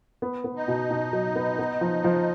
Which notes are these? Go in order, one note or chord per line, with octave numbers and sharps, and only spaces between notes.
B3
B3
D#4
B2
B2
F#3
B3
B3
F3
F3